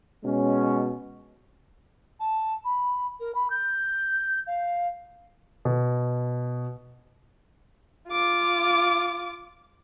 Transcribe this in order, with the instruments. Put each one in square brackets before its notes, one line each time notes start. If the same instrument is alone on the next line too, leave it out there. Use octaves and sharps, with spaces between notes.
[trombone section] B2 G#3 C#4
[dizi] A5
B5
A#4
B5
G6
F5
[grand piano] B2
[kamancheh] F4 D6